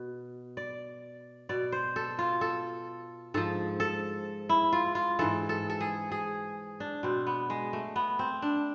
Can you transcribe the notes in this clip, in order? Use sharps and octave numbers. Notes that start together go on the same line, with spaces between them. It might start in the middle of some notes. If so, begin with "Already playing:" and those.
Already playing: B2
D5
B2 D5
C5
A4
F4
A4
G#2 F3 A4
A4
E4
F4
F4
G#2 E3 A4
A4
A4
G#4
G#4
D4
B2 C4
B3
G#3
A3
B3
C4
D4